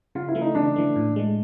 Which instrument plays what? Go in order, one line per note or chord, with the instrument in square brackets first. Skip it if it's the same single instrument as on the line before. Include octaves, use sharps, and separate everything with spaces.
[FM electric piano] C#3 [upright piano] F4
[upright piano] E4
[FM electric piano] E3 A3
[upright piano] D#4
[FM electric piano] C#3 [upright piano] D4
[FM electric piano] E3 A3
A2
E3 G#3